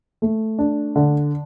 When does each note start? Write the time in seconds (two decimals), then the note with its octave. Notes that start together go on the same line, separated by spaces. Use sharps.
0.22 A3
0.59 D4
0.96 D3